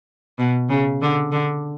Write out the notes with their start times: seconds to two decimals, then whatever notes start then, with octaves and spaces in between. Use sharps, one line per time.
0.39 B2
0.70 C#3
1.02 D3
1.32 D3